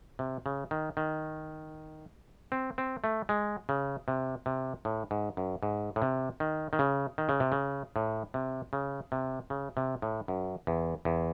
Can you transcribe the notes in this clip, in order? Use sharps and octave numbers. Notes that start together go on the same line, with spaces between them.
C3
C#3
D#3
D#3
C4
C4
A3
G#3
C#3
C3
C3
A2
G#2
F#2
G#2
A2
C3
D#3
D#3
C#3
D#3
C#3
C3
C#3
A2
C3
C#3
C3
C#3
C3
A2
F#2
E2
E2